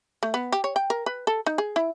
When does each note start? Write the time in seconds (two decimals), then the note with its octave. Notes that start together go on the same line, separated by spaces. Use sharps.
0.23 A3
0.34 B3
0.52 G4
0.64 C#5
0.76 G5
0.90 A#4
1.06 B4
1.27 A4
1.46 D#4
1.58 G#4
1.76 E4